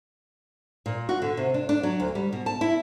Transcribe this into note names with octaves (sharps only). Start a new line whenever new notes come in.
A#2
F#4
D3
C3
D4
D4
F#3
D2
G3
B2
A5
E4